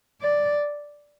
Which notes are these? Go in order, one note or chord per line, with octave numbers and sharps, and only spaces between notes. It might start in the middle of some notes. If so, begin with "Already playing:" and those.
D5